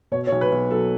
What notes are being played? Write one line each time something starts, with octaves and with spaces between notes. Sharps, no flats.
B2 C#5
C#5
B1
B4
B1
F#3 A4